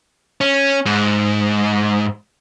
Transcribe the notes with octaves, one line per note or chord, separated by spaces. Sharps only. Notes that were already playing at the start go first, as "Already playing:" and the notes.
C#4
G#2